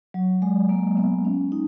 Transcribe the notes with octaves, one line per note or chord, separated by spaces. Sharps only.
F#3
G#3
A#3
B3
C#4
D#4